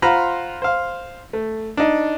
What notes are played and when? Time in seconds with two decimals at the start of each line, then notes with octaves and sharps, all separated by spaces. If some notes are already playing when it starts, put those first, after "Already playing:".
0.02 F4 C5 F#5 A#5 B5
0.62 C5 F5
1.33 A3
1.77 D4 D#4